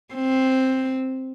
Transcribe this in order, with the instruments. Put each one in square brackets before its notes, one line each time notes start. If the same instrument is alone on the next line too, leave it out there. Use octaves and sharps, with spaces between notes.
[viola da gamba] C4